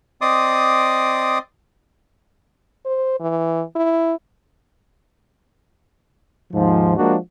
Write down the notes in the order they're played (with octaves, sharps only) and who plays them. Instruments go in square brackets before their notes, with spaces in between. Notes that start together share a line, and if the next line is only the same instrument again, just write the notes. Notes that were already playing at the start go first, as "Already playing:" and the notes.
[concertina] C4 D5 D#5 C6 D6 D#6
[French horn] C5
E3
E4
[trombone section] D#2 G#2 F3
F3 G#3 A#3 D4 F#4